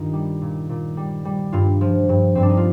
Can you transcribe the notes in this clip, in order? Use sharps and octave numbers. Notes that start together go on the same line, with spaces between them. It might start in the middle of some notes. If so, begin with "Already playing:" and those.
Already playing: G2 D#3 D#4 F4 G4 F5
G3
A#2
A#2
G3
G3
G2 F4
F3
G2
G2 C4
D4
D#4
F4